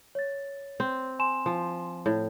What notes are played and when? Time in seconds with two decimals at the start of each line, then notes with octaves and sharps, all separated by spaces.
0.15 C#5 A6
0.80 C4
1.19 G#5 C6 E7
1.46 F3
2.06 A2